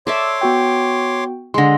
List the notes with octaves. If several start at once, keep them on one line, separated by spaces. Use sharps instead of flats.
A4 C#5 D5 E5 C6 D6
B3 F#4 G5
D3 G#3 C6 A#6